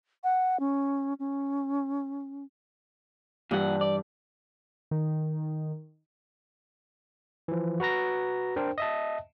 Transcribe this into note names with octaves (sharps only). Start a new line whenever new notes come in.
F#5
C#4
C#4
G2 A#2 E3 G4 F#5
D5
D#3
E3 F3
F#4 B4 A#5 A#6
D4 A#4 C5 G5
D#5 E5 A5